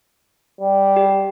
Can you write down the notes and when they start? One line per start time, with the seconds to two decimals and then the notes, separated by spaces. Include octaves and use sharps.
0.61 G3
0.96 G4